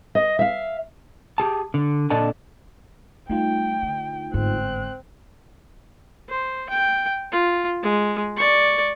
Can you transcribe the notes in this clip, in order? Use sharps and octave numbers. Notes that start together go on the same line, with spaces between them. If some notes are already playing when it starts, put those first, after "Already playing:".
D#5
E5 F5
G4 G#4 A5
D3
A#2 D4 A4 D5 D#5 A5
G3 A3 D#4 F4 G5
D3
G1 G#2 C4 F#6
C5
G5
F4
G#3
D5 C#6